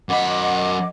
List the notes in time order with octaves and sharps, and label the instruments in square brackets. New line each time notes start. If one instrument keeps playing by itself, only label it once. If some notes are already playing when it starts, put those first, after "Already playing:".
[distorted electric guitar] F#2 B5 [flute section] D#5 F#5 D6